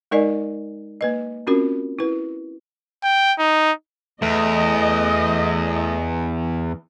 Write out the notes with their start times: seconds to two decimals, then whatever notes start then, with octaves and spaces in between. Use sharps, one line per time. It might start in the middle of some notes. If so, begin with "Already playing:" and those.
0.11 G#3 D#4 A#4 D5 D#5 G#5
1.01 A#3 B4 D#5
1.47 C4 C#4 F4 F#4 A#4
1.99 E4 B4
3.04 G5
3.39 D#4
4.22 E2 A3 D#5